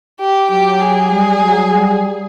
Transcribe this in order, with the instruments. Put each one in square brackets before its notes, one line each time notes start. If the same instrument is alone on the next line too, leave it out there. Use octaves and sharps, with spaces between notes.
[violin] G4
[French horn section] F#3 [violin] G4
[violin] G#4
[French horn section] G3
F#3
G3